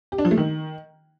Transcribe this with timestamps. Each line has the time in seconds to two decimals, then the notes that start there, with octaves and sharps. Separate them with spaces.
0.12 G4
0.18 D4
0.25 F3
0.31 A3
0.37 D#3